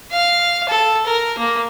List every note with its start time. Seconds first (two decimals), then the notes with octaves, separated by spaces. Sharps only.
0.12 F5
0.69 A4
1.06 A#4
1.38 A#3